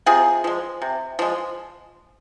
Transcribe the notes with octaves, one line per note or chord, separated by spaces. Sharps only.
C3 F4 G#4
F3 G#3
C3
F3 G#3